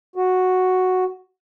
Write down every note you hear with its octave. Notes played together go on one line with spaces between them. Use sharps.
F#4